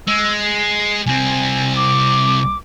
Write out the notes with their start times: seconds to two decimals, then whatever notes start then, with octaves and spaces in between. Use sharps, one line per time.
0.07 G#3 E6
0.44 C7
1.06 C2 C4 G#5
1.76 D6